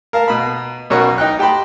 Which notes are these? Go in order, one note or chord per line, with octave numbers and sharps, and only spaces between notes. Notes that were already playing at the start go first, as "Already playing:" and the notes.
A#4 F5 A5
B2 B5
B1 B2 C#4 F#4 A#4 C#6
D#4 G5 F#6
G4 G5 A5 B5 C6